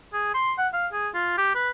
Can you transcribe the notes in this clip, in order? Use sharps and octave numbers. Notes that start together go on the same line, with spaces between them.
G#4
C6
F#5
F5
G#4
F4
G4
B4